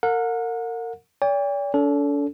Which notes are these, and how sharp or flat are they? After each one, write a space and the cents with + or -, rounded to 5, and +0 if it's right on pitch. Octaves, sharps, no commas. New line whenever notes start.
A#4 -30 F#5 -35
D5 -45 G5 +40
D4 -45 A4 +0